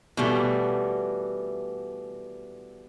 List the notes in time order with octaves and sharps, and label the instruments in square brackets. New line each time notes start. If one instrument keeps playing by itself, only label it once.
[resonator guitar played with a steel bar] B2 E3 G3 A3